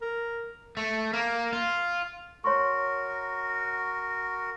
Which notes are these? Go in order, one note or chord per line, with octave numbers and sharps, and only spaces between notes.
A#4
A3
A#3
F4
F#4 A#4 C#5 C6 C#6